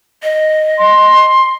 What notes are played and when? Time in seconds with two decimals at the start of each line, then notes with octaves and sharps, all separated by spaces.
0.23 D#5
0.78 C6